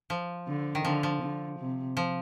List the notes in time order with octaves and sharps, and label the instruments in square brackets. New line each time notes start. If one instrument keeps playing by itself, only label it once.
[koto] F3
[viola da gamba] D3
[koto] D#3
[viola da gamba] D3 [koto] F3
[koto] F3
[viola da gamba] D3
C3
[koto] F3